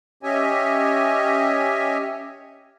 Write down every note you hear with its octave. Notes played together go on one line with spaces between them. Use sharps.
C#4 G4 C#5 D#5 E5 G#5